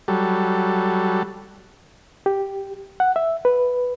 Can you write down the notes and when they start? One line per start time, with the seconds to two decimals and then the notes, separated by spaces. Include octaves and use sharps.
0.08 F#3 G3 A4
2.26 G4
3.00 F#5
3.16 E5
3.45 B4